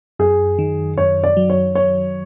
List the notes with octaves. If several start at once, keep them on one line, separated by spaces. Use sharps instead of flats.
F#2 G#4
D#3
F#2 C#5
D5
F#3
C#5
F#3 C#5